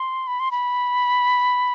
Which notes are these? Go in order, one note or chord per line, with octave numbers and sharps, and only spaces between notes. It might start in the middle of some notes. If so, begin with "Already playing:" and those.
Already playing: C6
B5
C6
B5